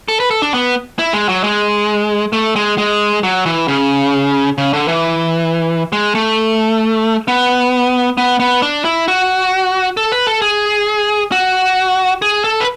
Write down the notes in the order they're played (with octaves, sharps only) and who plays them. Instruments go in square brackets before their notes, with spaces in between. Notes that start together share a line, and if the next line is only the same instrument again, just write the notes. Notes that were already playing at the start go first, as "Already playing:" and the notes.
[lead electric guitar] A4
B4
A4
D4
B3
E4
G#3
F#3
G#3
A3
G#3
G#3
F#3
E3
C#3
C#3
D3
E3
G#3
A3
B3
B3
B3
D4
E4
F#4
A4
B4
A4
G#4
F#4
G#4
A4
B4